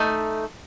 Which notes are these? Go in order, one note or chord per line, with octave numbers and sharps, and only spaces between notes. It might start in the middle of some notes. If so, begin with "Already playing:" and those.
Already playing: A3 D#4